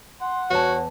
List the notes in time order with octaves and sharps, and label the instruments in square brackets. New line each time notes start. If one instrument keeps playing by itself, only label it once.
[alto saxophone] F#5 [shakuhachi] C6
[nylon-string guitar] E2 A5 [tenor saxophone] F#4 [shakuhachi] C#5